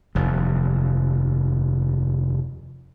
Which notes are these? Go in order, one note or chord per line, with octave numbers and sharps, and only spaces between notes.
F1 D#2